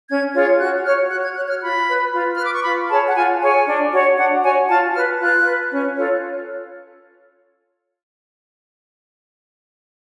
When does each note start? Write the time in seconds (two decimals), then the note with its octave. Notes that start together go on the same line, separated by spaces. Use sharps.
0.08 C#4 G#6
0.34 F4 G#4 C#5
0.59 F#4 F#6
0.85 C#5 F6
1.11 F#4 F#6
1.24 G#6
1.36 C#5 F#6
1.49 F6
1.62 F4 B5
1.87 B4
2.13 F4
2.36 B4 F6
2.45 D6
2.54 C#6
2.64 F4 B5
2.89 G#4 C#5 A5
3.07 F#5
3.15 F4 G#5
3.41 G#4 C#5 G#5
3.66 D4
3.92 F#4 C#5
4.17 D4 F#5
4.43 F#4 C#5 G#5
4.68 F4 A5
4.94 B4 F6
5.20 F4 F#6
5.45 B4
5.70 C#4
5.96 F4 A4 C#5